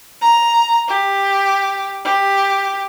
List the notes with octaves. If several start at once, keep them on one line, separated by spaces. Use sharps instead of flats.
A#5
G4
G4